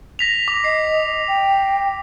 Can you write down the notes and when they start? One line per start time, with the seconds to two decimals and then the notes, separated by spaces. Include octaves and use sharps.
0.19 A#6 B6 F7
0.48 D6
0.64 D#5 C7
1.28 G5